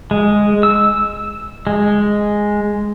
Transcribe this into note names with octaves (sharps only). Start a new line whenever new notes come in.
G#3
E6
G#3